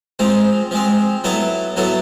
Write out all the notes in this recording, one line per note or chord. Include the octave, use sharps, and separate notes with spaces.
F3 G#3 C4
F3 G#3 C4
F#3 B3 E4 A4
F#3 B3 E4 A4